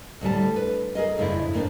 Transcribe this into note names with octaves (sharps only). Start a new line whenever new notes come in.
D2 A2 G3 A5
B4
G#4 A#4 D#5
F2 G#2 C#3 D4 E4
F2 A2 A#3 C#4 D4